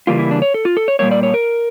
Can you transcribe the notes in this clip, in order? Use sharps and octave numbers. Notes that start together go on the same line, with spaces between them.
C#3 E3 G3 A#3 F4
E4
D4
C#5
A4
F4
A4
C#5
A#2 G3 A#3 C#5
D5
C#5
A#4